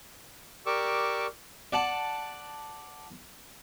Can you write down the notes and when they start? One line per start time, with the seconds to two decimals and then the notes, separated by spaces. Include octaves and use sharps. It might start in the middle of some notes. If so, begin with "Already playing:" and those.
0.66 G4 A#4 D5 C#6 D6 E6
1.73 D5 F#5 A5